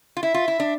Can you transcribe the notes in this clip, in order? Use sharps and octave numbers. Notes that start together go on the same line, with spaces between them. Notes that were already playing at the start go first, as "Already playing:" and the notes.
F4
E4 E5
F4
E4
D4